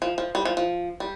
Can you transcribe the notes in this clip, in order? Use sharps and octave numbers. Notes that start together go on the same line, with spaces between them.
F3
F3
G3
F3
F3
G3